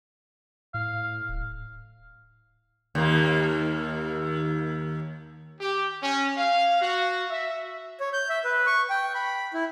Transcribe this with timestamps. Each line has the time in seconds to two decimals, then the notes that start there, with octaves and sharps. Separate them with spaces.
0.74 A2 F5
1.29 D1
2.95 D#2 A#3
5.61 G4
6.02 C#4
6.38 F5
6.81 F#4
7.31 E5
8.00 C#5
8.13 G6
8.30 E5
8.45 B4
8.67 C#6
8.90 G5
9.15 B5
9.54 E4